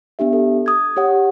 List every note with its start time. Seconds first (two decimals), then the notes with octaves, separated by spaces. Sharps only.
0.19 B3 D4 G4 E5
0.33 A4
0.66 D#6 G#6
0.96 G4 C#5 F#5